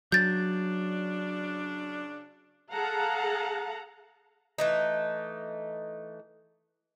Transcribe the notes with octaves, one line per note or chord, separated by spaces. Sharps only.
C#3 F#3 D4 G6 A6
G#4 A4 F5 F#5 A5 A#5
E3 A3 D#4